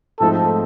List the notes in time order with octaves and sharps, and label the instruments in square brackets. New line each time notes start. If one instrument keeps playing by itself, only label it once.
[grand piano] G#2 F3 A3 C4 D#4 [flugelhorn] A4